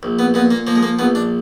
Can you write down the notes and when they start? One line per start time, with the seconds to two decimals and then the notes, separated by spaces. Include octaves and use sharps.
0.03 A#1
0.19 B3
0.34 A#2 B3
0.51 A#3
0.67 F3 A#3
0.75 G#3
0.83 A#3
0.99 A#1 B3
1.15 D4